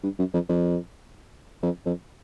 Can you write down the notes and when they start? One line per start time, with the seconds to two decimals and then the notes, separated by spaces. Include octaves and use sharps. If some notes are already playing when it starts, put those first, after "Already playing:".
0.03 G2
0.19 F#2
0.34 F2
0.49 F2
1.63 F2
1.85 F2